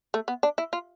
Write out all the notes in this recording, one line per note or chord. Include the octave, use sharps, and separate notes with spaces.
A3
B3
D4
E4
F4